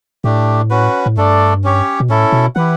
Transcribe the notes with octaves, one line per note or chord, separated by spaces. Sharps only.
A2 A3 D4 G4
C#4 F#4 B4
A2
G2 A3 D4 A4 D5
C#4 G4 C#5
B2
A2 C#4 E4 A4
B2
E3 E4 G4 B4 F#5